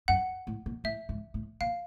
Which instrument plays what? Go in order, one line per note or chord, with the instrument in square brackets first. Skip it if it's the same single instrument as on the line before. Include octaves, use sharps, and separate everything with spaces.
[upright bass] F#2 [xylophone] F#5
[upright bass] A2
A#2
[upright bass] A2 [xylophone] E5
[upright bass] G#2
A2
[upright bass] A#2 [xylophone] F5